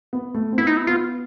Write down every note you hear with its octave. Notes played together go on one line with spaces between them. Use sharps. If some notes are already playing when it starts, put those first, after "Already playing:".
B3
A3
C4
B3 E4
D#4
E4
B3 F4